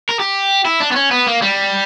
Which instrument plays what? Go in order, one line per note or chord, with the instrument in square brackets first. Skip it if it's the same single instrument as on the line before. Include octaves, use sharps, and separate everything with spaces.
[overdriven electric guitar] A#4
G4
E4
D4
B3
C#4
B3
A#3
G3